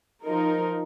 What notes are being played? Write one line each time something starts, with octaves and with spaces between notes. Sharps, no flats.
F3 D#4 A#4